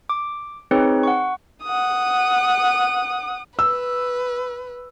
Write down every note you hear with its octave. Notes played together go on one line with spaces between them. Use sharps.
D6
C4 D#4 G#4 B4 C#5
F#5 C#6
F#5 D#6
B4 E6